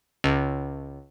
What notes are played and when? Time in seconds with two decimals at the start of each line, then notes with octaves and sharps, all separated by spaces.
0.24 C#2